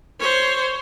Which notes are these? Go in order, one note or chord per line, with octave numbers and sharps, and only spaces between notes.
C5 C#5